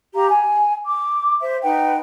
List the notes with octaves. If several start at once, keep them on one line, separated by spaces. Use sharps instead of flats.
G4 F5 A#5
G#5
D6
C5 E5
D#4 B4 F#5 G5